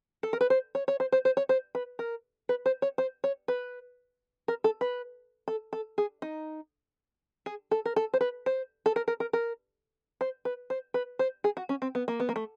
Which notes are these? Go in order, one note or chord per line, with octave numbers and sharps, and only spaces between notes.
A4
A#4
B4
C5
C#5
C#5
C5
C5
C5
C#5
C5
B4
A#4
B4
C5
C#5
C5
C#5
B4
A#4
A4
B4
A4
A4
G#4
D#4
G#4
A4
A#4
A4
C5
B4
C5
A4
A#4
A#4
A#4
A#4
C5
B4
C5
B4
C5
G#4
F#4
C#4
C4
B3
A#3
B3
A#3
A3